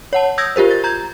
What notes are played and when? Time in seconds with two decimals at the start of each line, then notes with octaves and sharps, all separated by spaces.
0.13 C#5 F#5 A5
0.38 D#6 E6 G6 G#6 A#6
0.56 F4 G4 A#4 C5
0.71 A6
0.84 A#5 G6 G#6